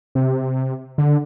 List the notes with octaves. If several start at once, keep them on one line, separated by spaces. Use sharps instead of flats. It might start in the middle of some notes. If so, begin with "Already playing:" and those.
C3
D3